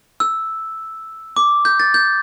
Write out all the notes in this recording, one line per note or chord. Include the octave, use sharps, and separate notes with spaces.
E6
D6
G6
A6
G6